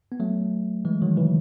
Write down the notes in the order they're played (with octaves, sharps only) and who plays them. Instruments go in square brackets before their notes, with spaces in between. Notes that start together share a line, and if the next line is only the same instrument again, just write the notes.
[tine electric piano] B3
F#3 A3
E3 G#3
D#3 F#3
C#3 E3